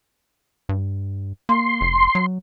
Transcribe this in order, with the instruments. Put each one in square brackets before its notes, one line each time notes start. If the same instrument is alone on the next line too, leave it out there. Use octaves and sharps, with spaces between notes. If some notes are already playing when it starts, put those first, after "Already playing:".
[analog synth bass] G2
[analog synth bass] A#3 [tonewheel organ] C6
[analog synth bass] F1
F#3